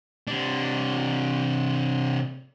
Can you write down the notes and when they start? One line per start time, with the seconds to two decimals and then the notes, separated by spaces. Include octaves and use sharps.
0.27 C3 D4